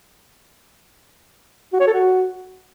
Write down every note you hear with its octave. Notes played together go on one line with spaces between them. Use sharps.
F#4
C#5
A4
F#4